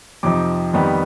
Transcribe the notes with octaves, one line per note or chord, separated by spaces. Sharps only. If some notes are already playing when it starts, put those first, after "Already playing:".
F2 C3 F3 C4 D#4 D6
F2 D#3 G3 B3 D#4